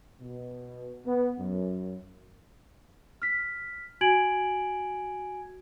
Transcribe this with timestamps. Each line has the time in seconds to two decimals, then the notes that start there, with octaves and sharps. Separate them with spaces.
0.20 B2
1.06 B3
1.39 F#2
3.22 F6 B6
4.01 F#4 G#5 G#6 D7 F#7